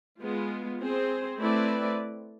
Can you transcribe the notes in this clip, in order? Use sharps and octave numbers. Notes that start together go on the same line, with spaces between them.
G#3 B3 F4
C4 G#4 C5
A3 C4 E4 B4 D5